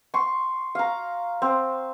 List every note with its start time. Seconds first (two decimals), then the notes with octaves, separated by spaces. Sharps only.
0.14 C6 C#6
0.75 F5 A#5
1.42 C4